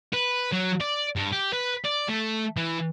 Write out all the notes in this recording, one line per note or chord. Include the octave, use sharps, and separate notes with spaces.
B4
F#3
D5
G2
G4
B4
D5
A3
E3